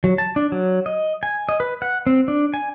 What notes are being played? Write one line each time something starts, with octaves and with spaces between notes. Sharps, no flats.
F#3
A5
D4
F#3
D#5
G#5
D#5
B4
F#5
C4
D4
G#5